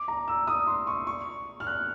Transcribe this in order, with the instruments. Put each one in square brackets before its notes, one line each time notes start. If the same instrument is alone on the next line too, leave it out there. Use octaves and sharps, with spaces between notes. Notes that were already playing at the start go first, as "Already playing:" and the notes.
Already playing: [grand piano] D6
A#5
E6
D#6
C6
C#6
C#6
F6
F#6